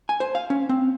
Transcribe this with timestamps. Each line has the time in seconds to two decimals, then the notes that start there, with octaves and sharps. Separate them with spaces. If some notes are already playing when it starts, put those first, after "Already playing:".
0.09 G#5
0.20 C5
0.35 F5
0.50 C#4
0.69 C4